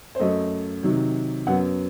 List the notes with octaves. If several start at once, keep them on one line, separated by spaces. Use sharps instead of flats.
C5
F#2 F#3 A3 D#5
C3 D#3 F#3
F#2 F#3 B3 F#5